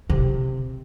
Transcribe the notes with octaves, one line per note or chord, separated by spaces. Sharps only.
C3